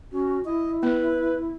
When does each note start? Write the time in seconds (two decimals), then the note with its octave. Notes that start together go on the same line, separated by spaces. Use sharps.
0.12 C#4 F#4
0.45 E4 D#5
0.83 B3 B4